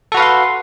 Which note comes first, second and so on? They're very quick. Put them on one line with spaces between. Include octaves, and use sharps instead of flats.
A4 F#4 B4 F5 C6